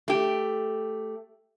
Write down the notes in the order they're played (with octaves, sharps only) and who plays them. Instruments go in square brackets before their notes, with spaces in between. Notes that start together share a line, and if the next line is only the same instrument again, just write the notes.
[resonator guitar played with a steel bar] A3 G4